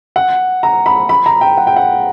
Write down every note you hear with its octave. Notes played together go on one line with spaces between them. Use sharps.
F#5
A#5
B5
B5
A#5
G5
F#5
G5
F#5